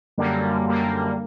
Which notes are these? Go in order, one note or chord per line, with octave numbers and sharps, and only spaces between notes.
F#2 D3 G3 A#3
F#2 D3 G3 A#3